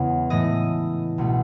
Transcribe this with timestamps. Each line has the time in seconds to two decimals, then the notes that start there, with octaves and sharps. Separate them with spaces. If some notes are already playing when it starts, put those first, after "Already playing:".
Already playing: E2 C#3 G#3 B3 C#5
0.30 A2 E3 A3 D#5
1.18 C#2 B2 A3